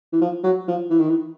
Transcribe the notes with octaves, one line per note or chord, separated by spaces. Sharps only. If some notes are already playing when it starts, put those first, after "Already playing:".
E3
F3
F#3
F3
E3
D#3
E3